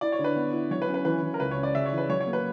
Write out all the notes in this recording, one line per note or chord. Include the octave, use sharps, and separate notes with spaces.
E4 D5
C#5
D3
B4
B3
E4
F#3 C#5
B4
C#4
B4
E3 B4
E3
A#4
C#2 B4
C#5
C#4
D5
C#3 E5
C#5
E3
B4
F#3 C#5
C#5
A#3
B4